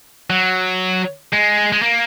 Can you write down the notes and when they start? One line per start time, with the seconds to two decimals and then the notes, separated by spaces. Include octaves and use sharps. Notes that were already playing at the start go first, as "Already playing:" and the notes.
0.30 F#3
1.33 G#3
1.72 G#3
1.82 A#3